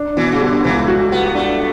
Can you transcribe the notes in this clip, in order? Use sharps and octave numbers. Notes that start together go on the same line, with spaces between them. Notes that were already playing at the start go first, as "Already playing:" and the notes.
Already playing: D4
B2 E3
C#3
D3 G3
C#2 E3
F#4
G3 B3
A3 D4